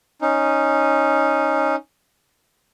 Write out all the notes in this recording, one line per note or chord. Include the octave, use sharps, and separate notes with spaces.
C#4 D#4